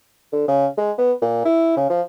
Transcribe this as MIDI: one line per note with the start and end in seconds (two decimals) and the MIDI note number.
0.32 0.46 50
0.48 0.66 49
0.77 0.92 56
0.98 1.12 59
1.22 1.40 46
1.45 1.72 64
1.77 1.85 49
1.90 2.01 53